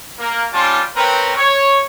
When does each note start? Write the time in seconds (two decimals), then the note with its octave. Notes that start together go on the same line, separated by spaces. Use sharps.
0.19 A#3 A#4
0.52 G3 C#4 F4 A5 C6 D6
0.95 C4 A#4 B4 C#5 G5 A#5
1.36 C#5